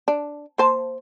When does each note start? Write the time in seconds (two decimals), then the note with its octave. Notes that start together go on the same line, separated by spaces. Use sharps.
0.08 D4
0.58 A#3 C5 A5